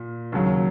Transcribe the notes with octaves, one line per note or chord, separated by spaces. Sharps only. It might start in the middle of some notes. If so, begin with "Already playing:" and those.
Already playing: A#2
D#2 C#3 F#3